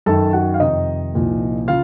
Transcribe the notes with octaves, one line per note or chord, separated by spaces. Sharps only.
F#2 D#3 A4 A5
F#4 F#5
F5
F2 C3 D#3 D#4 D#5
C2 A#2 F3
C#3 F4 F5